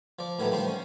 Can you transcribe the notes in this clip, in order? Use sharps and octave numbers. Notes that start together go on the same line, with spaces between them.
F3 D5
A2 D#3 F#3 A3 B3
D#3 F3 G3 C5 C6
C#4